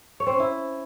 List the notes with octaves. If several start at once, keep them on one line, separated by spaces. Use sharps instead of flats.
C#5
C4
C#4
E4